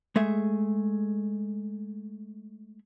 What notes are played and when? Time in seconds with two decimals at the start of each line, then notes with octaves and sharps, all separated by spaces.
0.16 G#3 A3 G#4 E5